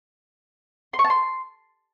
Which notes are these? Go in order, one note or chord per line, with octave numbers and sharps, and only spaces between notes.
C6
C#6
A5
C6